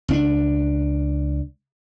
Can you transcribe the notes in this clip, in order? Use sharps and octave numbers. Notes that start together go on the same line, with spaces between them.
C#2 C#4 D4